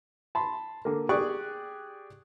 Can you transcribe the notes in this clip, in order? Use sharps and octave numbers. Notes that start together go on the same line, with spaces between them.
A5 B5 C6
D3 A#3
G4 G#4 D5 G5 C#6 F#6